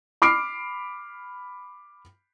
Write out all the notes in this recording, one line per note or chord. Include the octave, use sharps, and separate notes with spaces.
B5 D6 F6 C7 D7